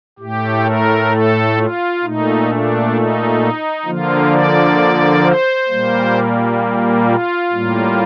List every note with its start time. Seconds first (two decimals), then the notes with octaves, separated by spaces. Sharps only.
0.19 A2 A3 G4
0.65 A#4
1.11 A4
1.57 F4
2.03 A#2 A3 D#4
2.49 D4
2.94 D#4
3.85 D3 F3 A#3 F4
4.32 D5
5.23 C5
5.69 A#2 G3 A#3
7.07 F4
7.52 A2 G3 A#3